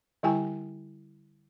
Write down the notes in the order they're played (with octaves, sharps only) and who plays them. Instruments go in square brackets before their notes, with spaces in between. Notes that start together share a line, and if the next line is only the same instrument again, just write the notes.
[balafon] D3 G3 E4 G4 G5 G#5